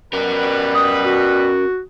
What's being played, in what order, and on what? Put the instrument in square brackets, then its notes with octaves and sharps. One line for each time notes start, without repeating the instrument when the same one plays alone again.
[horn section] B2 G3 B4 [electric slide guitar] C#4 A#4
[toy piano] D#6
[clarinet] F#4